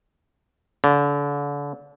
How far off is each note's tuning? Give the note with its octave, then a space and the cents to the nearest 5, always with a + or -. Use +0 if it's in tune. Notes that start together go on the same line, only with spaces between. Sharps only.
D3 -35